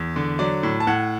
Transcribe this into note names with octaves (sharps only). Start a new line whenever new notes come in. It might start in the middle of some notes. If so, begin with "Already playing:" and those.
Already playing: E2
D3
F#3 D5
A2
A5
A2 F#5